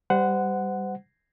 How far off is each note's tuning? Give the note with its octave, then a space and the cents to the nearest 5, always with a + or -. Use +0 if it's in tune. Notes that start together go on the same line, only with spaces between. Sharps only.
G3 +0 C5 -30 F#5 +0